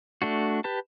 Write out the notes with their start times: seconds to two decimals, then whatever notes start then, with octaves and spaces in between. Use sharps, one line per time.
0.22 A3 D4 F#4
0.64 G4 B4 A5